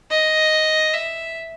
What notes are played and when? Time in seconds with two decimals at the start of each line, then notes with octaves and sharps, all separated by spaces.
0.11 D#5
0.94 E5